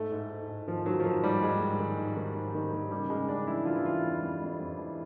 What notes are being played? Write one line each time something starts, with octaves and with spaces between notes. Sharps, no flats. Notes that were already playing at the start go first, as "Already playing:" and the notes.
Already playing: G#2 A3
G#2
G#2
G#2
D#3 F3
D#3 F#3
F3
D#3 F#3
G#2 G3
G#2 G#3
G#2
D#3
G#2
D#3
G#2
D#3
D#3
C#3 G3
C#3 G#3
C#3 D4
E3 E4
E3 F4
E4
E3 F4
F2
F2
F2
F2
E3